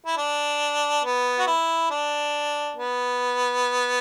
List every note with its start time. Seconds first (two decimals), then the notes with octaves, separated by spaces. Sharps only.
0.06 E4
0.17 D4
1.04 B3
1.39 F#4
1.47 E4
1.90 D4
2.76 B3